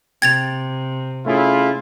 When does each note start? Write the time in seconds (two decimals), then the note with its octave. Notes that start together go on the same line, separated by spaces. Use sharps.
0.22 C3 G5 G#6 A6 F7
1.26 A3 C#4 E4 F4 G#4